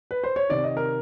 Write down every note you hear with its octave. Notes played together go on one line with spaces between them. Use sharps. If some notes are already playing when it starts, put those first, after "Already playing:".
B4
C5
C#5
C3 D#3 D5
D#5
A#4